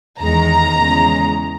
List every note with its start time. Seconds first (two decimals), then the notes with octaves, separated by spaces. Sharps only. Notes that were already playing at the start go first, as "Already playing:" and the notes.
0.20 E2 D#3 G#3 A#5
0.78 E2 C#3 G#3